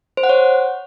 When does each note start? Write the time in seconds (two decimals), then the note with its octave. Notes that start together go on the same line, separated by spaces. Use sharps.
0.17 C5
0.23 F#5
0.29 C#5